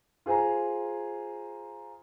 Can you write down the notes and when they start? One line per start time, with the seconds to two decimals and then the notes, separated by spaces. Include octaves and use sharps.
0.26 F4 G#4 C5 G#5 A#5